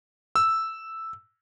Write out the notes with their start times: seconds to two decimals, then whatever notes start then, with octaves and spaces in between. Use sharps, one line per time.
0.36 E6